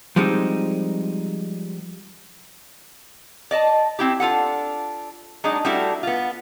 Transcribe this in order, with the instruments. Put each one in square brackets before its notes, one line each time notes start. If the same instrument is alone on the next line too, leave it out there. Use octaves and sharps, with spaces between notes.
[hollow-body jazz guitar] F3 G3 G#3 C4 D#4
[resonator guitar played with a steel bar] D5 D#5 A5
C4 E4 G4
D4 F4 A4 F#5
F#3 G#3 D4 D#4
G3 A3 D4 E4 F#4
B3 F4